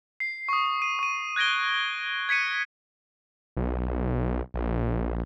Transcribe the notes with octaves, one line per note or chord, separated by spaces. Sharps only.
C7
C#6 D#6
D#7
C#6 D#7
F#6 G#6 A#6 D7 G7
G#6 B6 C#7 D#7
B1
A#1